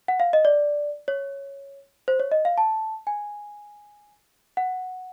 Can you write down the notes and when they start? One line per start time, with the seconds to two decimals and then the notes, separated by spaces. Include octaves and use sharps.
0.08 F#5
0.20 F5
0.33 D#5
0.45 D5
1.08 C#5
2.08 C5
2.20 C#5
2.32 D#5
2.45 F5
2.58 A5
3.07 G#5
4.57 F#5